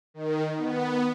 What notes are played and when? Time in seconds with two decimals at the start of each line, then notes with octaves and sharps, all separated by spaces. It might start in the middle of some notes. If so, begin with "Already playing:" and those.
0.14 D#3
0.58 B3